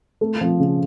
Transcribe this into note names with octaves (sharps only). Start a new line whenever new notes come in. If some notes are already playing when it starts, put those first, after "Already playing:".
A3
F3
C#3